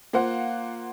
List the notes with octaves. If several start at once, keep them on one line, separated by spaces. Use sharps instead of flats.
A#3 F4 C5 F#5